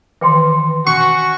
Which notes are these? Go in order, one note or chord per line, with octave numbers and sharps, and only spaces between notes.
D#3 E3 B4 G5 C6
C#4 F#4 C#6